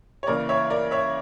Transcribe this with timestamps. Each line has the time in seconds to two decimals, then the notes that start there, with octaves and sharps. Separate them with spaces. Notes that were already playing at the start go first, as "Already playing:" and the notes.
0.23 C#5
0.27 C#3 E3 A#3 A#4 D5
0.49 C#5 E5
0.70 A#4 D5
0.91 C#5 E5